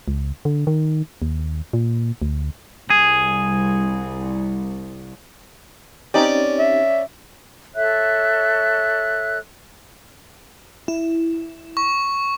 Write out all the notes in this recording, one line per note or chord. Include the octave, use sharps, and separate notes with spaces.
C#2
D3
D#3
D#2
A#2
D2
C2 G#4
C4 C#4 D#4 G4 D5
E5
A4 C#5 E5 F#6
E4
C#6